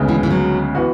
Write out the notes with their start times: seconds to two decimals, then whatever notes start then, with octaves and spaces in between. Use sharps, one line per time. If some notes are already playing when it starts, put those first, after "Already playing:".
Already playing: D2 C#3 G#3 B3
0.09 E3
0.23 E3
0.31 F#3
0.75 E3 B3 F#4